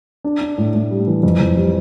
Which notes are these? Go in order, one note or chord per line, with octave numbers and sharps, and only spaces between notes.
D4
D4
A2
A2
G3
E3
F2
F2
G3